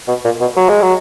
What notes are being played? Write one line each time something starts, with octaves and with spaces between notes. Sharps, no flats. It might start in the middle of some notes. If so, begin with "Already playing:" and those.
B2
A#2
B2
F#3
G#3
F#3